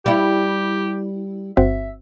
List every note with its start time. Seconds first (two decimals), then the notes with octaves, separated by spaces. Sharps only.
0.06 G3 E4 G4
1.57 G1 C4 F#4 E5